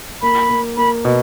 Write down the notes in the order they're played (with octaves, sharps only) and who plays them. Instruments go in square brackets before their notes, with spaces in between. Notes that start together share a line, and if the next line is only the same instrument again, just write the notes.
[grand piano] A#3 [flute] B5
[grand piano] A#3
[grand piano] A#3 [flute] B5
[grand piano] B2